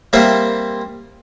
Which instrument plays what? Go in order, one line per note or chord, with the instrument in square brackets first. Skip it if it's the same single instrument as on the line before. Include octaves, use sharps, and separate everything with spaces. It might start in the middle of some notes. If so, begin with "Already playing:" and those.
[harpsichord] G3 A#3 C4 C5 E5